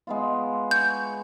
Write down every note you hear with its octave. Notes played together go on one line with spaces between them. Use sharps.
G#3 B3 F4
C#6 G6